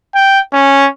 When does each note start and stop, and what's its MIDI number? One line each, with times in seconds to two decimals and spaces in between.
0.15 0.40 79
0.53 0.86 61